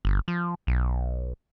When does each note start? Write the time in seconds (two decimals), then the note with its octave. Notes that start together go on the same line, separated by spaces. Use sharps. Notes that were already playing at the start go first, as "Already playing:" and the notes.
0.05 G1
0.28 F3
0.67 B1